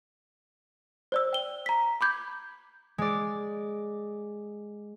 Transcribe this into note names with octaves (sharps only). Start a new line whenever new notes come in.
C5 D5 E6
G5 G7
A#5 B6
B5 D6 G6 G#6
G#3 D5